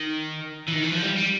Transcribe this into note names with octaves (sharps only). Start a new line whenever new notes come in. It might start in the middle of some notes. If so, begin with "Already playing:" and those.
Already playing: D#3
E3
D#3
E3
F3
G3
G3